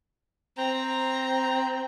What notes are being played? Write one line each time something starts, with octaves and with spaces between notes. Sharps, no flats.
C4 A#5